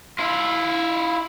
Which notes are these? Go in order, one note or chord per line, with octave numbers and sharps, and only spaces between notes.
E4 F4